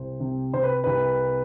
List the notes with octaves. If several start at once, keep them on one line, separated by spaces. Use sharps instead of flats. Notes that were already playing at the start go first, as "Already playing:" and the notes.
Already playing: C2 C5
C3
C3 C5
B4
C2 B4